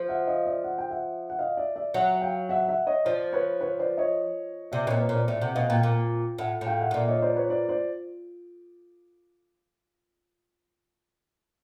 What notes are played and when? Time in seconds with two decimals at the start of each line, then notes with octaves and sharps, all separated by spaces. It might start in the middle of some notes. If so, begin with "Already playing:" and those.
Already playing: F3
0.09 E5 F#5
0.27 D#5 F5
0.46 D5 E5
0.64 F#5
0.78 G5
0.90 E5 F#5
1.30 F#5
1.39 D#5 F5
1.57 D5 E5
1.76 D5 E5
1.94 F#3 E5 F#5
2.22 F5 G5
2.49 E5 F#5
2.68 E5 F#5
2.86 C#5 D#5
3.05 F3 C5 D5
3.33 B4 C#5
3.61 B4 C#5
3.79 C5 D5
3.98 C#5 D#5
4.72 C3 D5 E5
4.86 B2 C#5 D#5
4.91 A#2
5.00 B4 C#5
5.09 A#2 C5 D5
5.27 A2 D5 E5
5.41 C3 E5 F#5
5.55 B2 D#5 F5
5.69 A#2 F5 G5
5.83 A#2
6.39 A2 E5 F#5
6.61 A2
6.67 F5 G5
6.81 E5 F#5
6.91 A2
6.94 A#2 D5 E5
7.08 C#5 D#5
7.22 C5 D5
7.36 B4 C#5
7.50 C5 D5
7.69 C5 D5